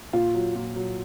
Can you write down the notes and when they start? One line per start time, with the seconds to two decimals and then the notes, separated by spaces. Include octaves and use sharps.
0.13 A#2 F4
0.34 F#3
0.55 A#2
0.76 F#3